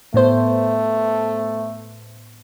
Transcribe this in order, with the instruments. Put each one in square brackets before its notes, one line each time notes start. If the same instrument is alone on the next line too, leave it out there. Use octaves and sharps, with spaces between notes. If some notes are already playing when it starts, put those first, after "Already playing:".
[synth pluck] A2 B3 C5 [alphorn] A3